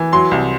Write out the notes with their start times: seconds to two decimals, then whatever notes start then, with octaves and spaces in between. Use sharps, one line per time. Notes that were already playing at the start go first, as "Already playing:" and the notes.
Already playing: E3
0.12 F#3 C6
0.31 C2